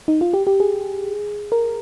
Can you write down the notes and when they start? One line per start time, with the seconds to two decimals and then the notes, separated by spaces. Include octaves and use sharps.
0.08 D#4
0.21 F4
0.34 G4
0.47 G4
0.60 G#4
1.52 A#4